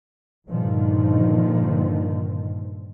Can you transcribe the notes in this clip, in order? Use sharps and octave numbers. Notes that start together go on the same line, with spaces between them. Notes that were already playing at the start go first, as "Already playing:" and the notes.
G2 A#2 D3 D#3 F3